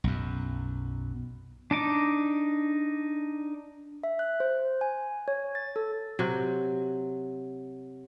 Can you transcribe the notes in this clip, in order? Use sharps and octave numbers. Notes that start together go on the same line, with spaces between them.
B1 F#2
D4 D#4 D6
E5
F#6
C5
G#5
C#5
A6
A4
C3 F#3